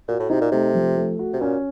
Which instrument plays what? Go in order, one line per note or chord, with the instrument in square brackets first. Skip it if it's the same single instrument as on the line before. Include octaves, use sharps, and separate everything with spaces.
[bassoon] A#2 [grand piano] F#4
[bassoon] A2
[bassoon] C3 [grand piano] D#4
[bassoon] A#2
[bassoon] C3 [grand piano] A3
[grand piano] F3
A3
F#4
[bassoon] C3
[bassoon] A#2 [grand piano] C#4